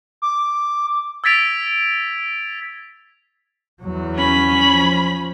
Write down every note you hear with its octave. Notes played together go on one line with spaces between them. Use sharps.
D6
E6 G#6 A6 B6 D7 F7
E2 F#3
C#4 B5
F3